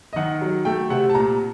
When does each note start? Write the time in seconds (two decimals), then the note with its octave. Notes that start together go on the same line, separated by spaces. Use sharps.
0.13 D#5
0.16 D#3 F#5
0.41 F#3
0.65 A3 G5
0.90 C3 F#5
1.09 A5
1.15 A#2 A#5